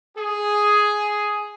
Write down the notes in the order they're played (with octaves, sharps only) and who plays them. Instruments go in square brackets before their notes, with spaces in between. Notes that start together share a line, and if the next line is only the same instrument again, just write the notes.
[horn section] G#4